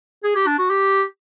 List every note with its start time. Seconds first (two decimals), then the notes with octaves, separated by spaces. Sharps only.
0.23 G#4
0.35 G4
0.47 D4
0.58 F#4
0.70 G4